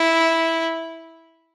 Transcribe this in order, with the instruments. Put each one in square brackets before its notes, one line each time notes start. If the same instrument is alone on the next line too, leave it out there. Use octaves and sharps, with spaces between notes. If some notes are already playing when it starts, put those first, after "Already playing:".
Already playing: [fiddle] E4